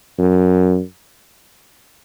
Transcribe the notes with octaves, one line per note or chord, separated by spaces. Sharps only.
F#2